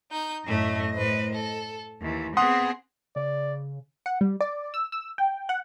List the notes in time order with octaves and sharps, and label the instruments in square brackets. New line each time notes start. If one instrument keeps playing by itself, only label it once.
[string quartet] D#4 G6
[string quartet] F#2 A2 A3 [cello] D#5
[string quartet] A2 B4 C5
A4
[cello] D#2 [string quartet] E3
[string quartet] B3 [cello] C4 G#4 [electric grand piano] F#5 C6 D#6
[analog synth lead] C#3 [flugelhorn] D5
[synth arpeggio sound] F#5
G3
D5
E6
E6
G5
F#5